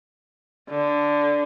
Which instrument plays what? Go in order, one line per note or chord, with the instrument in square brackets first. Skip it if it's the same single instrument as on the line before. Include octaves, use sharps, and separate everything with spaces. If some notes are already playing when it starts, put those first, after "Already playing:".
[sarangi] D3